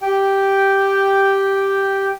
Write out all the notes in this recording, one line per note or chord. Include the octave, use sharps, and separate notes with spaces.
G4 G5